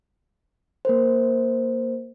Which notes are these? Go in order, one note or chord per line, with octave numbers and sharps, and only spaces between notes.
A#3 A#4 C5